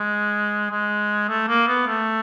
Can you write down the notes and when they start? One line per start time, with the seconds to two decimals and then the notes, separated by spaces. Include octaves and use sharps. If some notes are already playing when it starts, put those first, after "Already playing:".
Already playing: G#3
0.71 G#3
1.28 A3
1.48 A#3
1.68 B3
1.87 A3